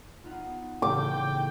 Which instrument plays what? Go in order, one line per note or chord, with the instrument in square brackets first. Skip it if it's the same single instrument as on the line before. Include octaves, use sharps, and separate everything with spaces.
[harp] B3 D#4 F4
[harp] A2 C#3 E3 [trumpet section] G5 [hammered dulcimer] D6